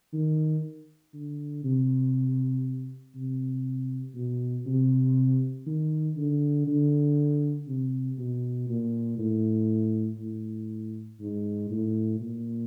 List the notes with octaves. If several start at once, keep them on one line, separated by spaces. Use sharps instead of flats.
D#3
D3
C3
C3
B2
C3
D#3
D3
D3
C3
B2
A#2
A2
A2
G#2
A2
A#2